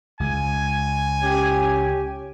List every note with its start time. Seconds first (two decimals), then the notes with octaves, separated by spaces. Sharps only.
0.20 C#2 G#5
1.23 C#4 G4